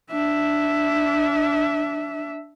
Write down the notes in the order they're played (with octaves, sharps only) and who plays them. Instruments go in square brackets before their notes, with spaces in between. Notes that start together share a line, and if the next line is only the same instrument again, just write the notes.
[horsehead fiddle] D4 E5